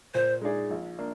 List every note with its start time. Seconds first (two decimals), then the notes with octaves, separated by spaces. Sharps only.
0.14 A#2 C5
0.41 G#3 D#4 G#4 D5
0.70 A#1
0.99 A#3 D4